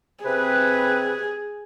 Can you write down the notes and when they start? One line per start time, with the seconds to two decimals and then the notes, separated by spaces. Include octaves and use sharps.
0.24 C3 C4 G#4 B4